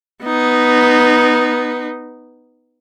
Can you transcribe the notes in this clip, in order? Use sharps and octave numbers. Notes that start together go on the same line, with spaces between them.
B3 D#4